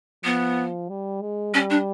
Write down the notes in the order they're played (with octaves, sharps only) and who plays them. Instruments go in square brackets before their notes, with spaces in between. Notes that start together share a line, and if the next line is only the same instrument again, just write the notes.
[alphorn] F3 [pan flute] B3
[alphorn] G3
G#3
[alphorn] G3 [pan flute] C#4
[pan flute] D4